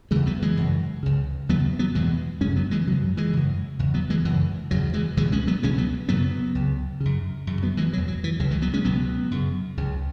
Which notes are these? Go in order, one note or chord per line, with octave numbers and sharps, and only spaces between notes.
E2 C#3 E3 G#3
F#3 B3
E3 G#3
F#2 C#3
C#2 C#3
E2 C#3 F#3 B3
F#3 B3
E2 B2 E3 G#3
F#2 C#3 G#3 C#4
F#3 B3
E3 G#3
F#2 C#3 F#3
F#3
E3 G#3
F#2 C#3
E2 C#3
F#3 B3
E3 G#3
F#2 C#3 E3
E2 C#3 F#3
E3 G#3
C#2 B2 E3 G#3
G#3 C#4
F#3 B3
C#2 B2 G#3 C#4
F#3 B3
F#2 C#3 F#3 B3
C#2 C#3
F#2 C#3
F#2 C#3
F#3 B3
E3 G#3
E2 B2 F#3
F#3
E3
C#2 C#3 F#3
E3 G#3
F#3 B3
G#3 C#4
C#2 B2 F#3 B3
F#2 C#3
C#2 C#3